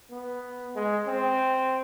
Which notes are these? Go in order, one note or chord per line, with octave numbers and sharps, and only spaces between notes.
B3
G#3
C4